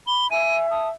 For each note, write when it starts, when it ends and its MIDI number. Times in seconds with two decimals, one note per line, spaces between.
0.07 0.28 83
0.07 0.27 103
0.31 0.91 76
0.31 0.67 80
0.31 0.56 99
0.71 0.89 81
0.71 0.88 87